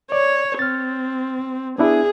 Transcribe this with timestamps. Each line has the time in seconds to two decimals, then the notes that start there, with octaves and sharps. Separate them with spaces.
0.12 C#5 D5
0.59 C4 F6 A6
1.78 B3 D4 E4 G#4